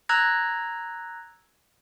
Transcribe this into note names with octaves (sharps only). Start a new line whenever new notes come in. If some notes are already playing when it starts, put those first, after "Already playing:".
A#5 E6 F#6 G#6 A#6